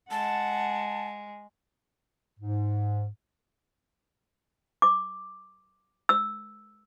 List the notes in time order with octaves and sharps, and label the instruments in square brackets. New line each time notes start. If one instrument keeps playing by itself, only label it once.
[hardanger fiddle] G#3 [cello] F#5 [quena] A5
[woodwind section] G#2
[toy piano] D6
E6